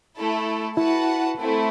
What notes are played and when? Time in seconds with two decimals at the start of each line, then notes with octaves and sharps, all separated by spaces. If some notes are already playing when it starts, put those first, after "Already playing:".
0.16 A3 E4 A4
0.77 E4 F#4 B4 F#5 A5
1.40 A3 C4 E4